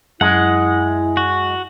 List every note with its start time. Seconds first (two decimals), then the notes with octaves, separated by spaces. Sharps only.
0.21 F#2 G#3 E4 F#5
1.17 F#4